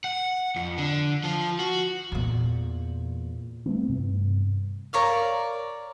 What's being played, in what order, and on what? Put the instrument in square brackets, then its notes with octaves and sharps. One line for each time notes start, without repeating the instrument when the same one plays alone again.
[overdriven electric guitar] F#5
F2
D3
F3 F4
F#4
[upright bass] E2 A#2
[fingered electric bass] G3 A3 B3 C4
G2 C3
[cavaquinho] A#4 C#5 D5 F5